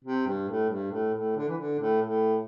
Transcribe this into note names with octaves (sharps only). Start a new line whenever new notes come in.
C3
G2
A2
G2
A2
A2
D3
E3
D3
A2
A2